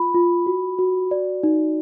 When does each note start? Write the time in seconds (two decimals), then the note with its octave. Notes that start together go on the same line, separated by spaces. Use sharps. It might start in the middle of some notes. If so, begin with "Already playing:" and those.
Already playing: F4 B5
0.14 F4
0.46 F#4
0.79 F#4
1.11 D5
1.43 D#4